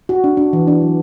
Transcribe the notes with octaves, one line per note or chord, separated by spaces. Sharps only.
F#4
D4
D4
E3
D4
F#3